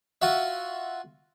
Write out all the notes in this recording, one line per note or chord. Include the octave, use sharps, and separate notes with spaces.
F4 F#4 E5